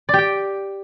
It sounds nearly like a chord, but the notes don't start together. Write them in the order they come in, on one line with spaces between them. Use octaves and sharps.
D5 G4 G5